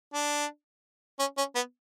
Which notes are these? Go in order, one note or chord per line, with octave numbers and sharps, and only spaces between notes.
D4
C#4
C#4
B3